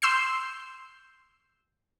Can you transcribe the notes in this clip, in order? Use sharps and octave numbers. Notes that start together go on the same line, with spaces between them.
C6 E6 G6 C7